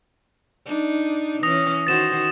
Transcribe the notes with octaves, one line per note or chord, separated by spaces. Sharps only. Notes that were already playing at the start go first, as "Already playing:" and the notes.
D4 D#4
E3 C#4 D#6 A#6
D#3 F#4 C5 A6 E7